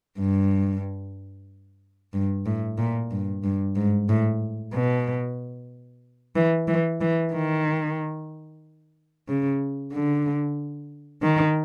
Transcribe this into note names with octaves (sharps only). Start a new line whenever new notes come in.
G2
G2
A2
A#2
G2
G2
G#2
A2
B2
E3
E3
E3
D#3
C#3
D3
D#3